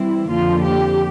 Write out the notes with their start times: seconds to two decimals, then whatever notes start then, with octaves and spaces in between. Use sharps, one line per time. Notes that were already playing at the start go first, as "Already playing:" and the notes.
Already playing: E3 G3 C4 E4
0.29 F2 D3 F3 A#3 F4
0.63 G4